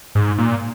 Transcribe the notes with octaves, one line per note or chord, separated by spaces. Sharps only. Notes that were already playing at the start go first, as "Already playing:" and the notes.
G#2
A#2